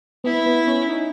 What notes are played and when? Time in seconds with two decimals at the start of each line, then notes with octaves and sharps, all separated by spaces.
0.24 B3 E4
0.46 B3
0.67 C#4
0.89 D#4